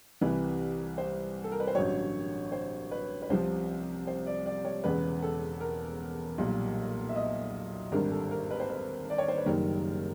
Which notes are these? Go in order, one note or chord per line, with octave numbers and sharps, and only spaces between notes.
C2 C3 E3 G3 B4
C5
A4
A#4
B4
C5
A1 G2 D3 F#3 C#5
C5
B4
B4
C2 C3 F3 C5
C5
D5
D5
C#5
E1 E2 C#3 B4
A4
A#4
B1 A#2 G3
E5
D#5
G#1 G2 D3 G3 A#4
A4
A#4
B4
C5
B4
D5
C#5
C5
B4
F#1 F#2 D#3 G3 A#4